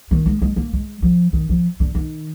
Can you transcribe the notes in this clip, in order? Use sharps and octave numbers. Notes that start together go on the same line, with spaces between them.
D#3
G#3
G#3
A#3
G#3
F3
D#3
F3
D3
D#3